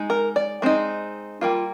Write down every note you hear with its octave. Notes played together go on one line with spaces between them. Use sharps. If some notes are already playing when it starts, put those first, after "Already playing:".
Already playing: G#3 D#4
A#4
D5
G#3 C4 D#4
G3 A#3 F4